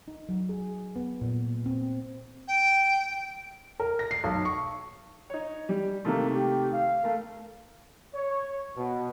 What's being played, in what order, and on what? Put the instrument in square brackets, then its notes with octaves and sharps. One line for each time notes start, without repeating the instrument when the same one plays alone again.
[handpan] D#4
F#3
G#4
B3
A#2
C4
[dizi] G5
[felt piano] A#4
A#6
C7
B1
C#6
[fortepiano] D#4 C#5
G3
[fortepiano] C3 D#3 A3 [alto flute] A#3
[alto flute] G4
F5
[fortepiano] A3 A#4
[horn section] C#5
B2